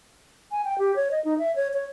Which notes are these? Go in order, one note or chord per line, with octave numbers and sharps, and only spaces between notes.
G#5
G5
G4
C#5
D#5
D#4
E5
C#5
C#5